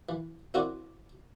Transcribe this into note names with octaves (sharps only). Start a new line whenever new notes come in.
E3
C4 E4 F#4 A#4 D5